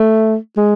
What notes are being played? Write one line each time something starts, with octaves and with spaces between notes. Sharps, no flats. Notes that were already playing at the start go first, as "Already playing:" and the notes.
Already playing: A3
G#3